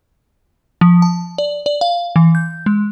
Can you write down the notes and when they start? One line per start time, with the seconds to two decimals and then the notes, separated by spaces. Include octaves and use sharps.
0.81 F3
1.02 A5
1.38 D5
1.66 D5
1.81 F5
2.16 E3
2.35 G6
2.66 G#3